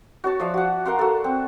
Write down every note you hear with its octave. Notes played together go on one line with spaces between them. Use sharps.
F#4 C#5 A5
F3 D5 E5 F5
F#4 F#5
A#4 F5 F#5 C6
F#4 A4
C4